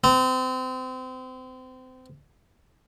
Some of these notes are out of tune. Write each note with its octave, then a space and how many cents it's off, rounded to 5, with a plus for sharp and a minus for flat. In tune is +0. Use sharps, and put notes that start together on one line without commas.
C4 -30